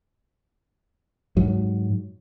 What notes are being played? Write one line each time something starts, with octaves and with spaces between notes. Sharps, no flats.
G#2 F#3